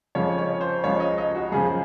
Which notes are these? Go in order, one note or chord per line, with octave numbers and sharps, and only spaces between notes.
F2 C#3 F3 C#5
C#5
C5
C#2 C#3 F3 C#5
D#5
D#5
F#4
F#2 C#3 F3 G#4